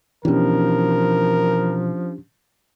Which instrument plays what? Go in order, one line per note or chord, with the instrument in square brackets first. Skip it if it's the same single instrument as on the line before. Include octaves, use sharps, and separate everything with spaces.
[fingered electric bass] B2 E3 [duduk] F3 [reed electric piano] C#4 D4 G4 [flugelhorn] A#4